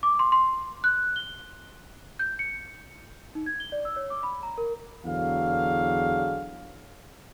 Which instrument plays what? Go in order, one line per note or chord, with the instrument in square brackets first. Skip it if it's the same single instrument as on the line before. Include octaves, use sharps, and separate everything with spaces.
[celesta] D6
C6
C6
F#6
G7
G6
C#7
D#4
G#6
G7
D5
E6
C#5
D6
B5
A#5
A#4
[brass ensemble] E2 D3 F#3 G#4 F5